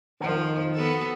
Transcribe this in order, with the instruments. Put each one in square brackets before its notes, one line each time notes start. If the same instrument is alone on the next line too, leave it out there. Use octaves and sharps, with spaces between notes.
[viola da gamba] F2 F3 [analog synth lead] D#3
[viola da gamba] B3 F#4 A4